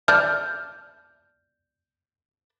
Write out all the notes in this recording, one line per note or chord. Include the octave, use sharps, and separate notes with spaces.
D5 E5 A5 F6 G6